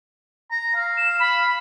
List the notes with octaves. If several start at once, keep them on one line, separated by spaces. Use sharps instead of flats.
A#5
F5
E7
B5